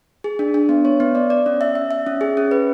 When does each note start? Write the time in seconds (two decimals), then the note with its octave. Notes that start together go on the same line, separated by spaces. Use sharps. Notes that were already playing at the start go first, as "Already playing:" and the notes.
0.24 G#4
0.39 D4
0.54 D4
0.69 B3
0.85 C#5
1.00 B3
1.15 D5
1.30 D5
1.46 C#4
1.61 E5
1.75 E5
1.91 E5
2.07 C#4
2.21 G#4
2.37 C#4
2.51 B4